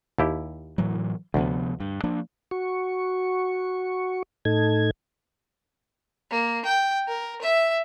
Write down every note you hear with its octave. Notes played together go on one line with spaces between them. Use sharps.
D#2 E4 G4
A2 E3 F#3
D2 C3 F3 B3
G2
F3 A#3 D4
F#4 C#6
A2 D#4 A4 G#6
A#3
G5
A#4
E5